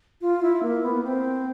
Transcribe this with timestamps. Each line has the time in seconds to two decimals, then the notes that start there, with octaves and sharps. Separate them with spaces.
0.21 F4
0.42 E4
0.63 A#3
0.83 B3
1.04 C4